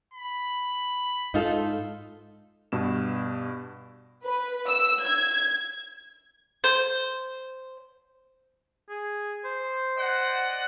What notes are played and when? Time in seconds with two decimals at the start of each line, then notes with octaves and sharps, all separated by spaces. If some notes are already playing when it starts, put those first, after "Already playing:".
0.14 B5
1.34 G#2 D#4 F4 A4
2.72 G2 B2 E7
4.25 B4
4.68 E6
5.04 G#6
6.64 C5
8.89 G#4
9.45 C5
9.97 D5 D#5 F#5